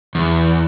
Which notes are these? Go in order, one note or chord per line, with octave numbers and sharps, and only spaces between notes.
E2